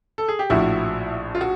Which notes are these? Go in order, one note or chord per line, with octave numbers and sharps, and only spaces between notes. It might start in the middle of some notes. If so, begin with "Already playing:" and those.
A4
G#4
G4
A#1 A2 F3 E4 F#4
F4
F#4